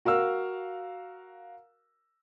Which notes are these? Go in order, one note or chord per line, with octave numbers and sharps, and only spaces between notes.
F#4 A#4 F5 E6